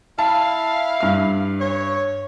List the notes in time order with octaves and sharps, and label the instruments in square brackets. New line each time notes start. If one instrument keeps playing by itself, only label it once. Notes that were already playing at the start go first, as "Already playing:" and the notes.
[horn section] E4 F5 [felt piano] A5
[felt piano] G2 F6
[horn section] C#5